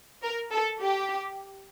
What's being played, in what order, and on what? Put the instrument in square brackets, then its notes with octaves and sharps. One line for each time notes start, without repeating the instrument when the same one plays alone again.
[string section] A#4
A4
G4